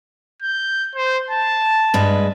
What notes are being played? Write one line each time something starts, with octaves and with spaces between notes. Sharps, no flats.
G6
C5
A5
G2 G#3 B4